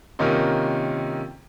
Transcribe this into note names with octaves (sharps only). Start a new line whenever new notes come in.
C3 D#3 A#3 C#4 D#4 F4